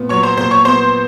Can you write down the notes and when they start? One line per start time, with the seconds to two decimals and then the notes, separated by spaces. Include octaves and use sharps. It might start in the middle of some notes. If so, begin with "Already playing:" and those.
Already playing: A#2 B3
0.09 F#3 C#5 C#6
0.23 C5 C6
0.37 A#2 C5 C6
0.51 C#5 C#6
0.65 B3 C5 C6